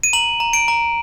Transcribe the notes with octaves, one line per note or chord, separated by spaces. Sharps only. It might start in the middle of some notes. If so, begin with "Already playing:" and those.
D#7
A#5 F#7
A#5
D7
A#5